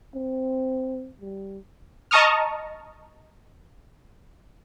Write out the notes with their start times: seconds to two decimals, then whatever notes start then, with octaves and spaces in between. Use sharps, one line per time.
0.15 C4
1.21 G3
2.11 D#5 A5 A#5 C#6 D#6 F6